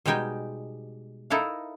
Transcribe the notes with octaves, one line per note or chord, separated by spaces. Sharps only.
B2 G3 G#3 D#4 G5 G#5
D#4 E4 A4 A#4 F5